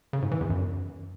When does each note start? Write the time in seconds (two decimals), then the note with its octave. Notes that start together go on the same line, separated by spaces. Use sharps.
0.13 C#3
0.22 G#2
0.31 E3
0.41 E2
0.50 F#2